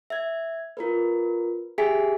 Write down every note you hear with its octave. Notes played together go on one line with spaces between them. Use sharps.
E5 G#6
F4 A#4 B4
G4 G#4 E5 G#5 B6 D7